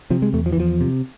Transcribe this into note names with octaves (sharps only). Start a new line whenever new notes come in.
C3 F3
G#3
E2 A3
F3
E3
E2 F3
C3